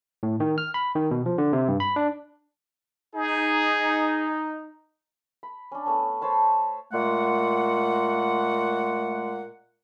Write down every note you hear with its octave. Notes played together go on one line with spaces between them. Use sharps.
A2
D#3
F6
B5
D#3
B2
F3
D3
C3
G2
B5
D4
D#4 G#4
B5
C#4 D4
A3 B3 C#4
C5 C#5 A5 B5
A#2 G#3 A3 F#5